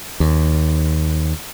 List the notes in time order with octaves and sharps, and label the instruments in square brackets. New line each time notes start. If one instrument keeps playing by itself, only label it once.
[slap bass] D#2